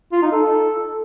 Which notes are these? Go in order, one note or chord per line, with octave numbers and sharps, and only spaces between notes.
F4
D#4
A4